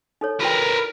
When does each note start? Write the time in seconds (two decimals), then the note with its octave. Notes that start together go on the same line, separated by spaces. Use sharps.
0.21 D#4 A4 C#5
0.41 E4 F#4 A#4 B4 G5